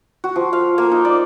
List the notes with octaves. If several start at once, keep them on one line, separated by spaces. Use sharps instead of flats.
F#4
F3
F5
A#3
D#4
D5